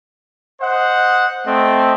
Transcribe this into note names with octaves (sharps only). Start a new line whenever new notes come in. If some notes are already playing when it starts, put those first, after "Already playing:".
C5 D#5 F#5
A3 C4 A4 D#5